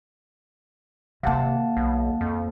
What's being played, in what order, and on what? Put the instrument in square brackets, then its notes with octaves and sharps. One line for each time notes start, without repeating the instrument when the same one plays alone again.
[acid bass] C3 [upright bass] D#3 A#3 [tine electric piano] F5 F#5 A5
[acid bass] B1
F2